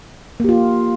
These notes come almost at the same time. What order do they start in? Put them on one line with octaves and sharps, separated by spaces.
A#3 G4 F4